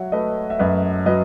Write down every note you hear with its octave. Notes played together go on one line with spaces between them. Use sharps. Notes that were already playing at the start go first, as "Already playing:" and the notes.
Already playing: F#3 C#5 E5 F#5
A3 B4 D#5
E5
F#2 B4 D#5
F#3 B4 D#5